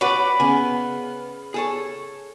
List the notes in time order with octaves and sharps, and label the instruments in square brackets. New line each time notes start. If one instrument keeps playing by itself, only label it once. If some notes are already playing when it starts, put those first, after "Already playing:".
[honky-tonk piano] F#4 F#5 [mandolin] B4 D5 [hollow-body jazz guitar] C#5
[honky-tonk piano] C#3 [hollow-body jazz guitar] B3 G#5
[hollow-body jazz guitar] G#4 A4 C#5